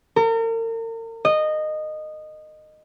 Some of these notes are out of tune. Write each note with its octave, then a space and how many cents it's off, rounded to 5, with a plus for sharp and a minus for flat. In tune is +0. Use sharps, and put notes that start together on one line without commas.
A#4 -40
D#5 -15